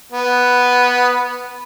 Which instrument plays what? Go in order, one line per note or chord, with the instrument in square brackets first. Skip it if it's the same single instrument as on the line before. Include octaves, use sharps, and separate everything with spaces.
[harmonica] B3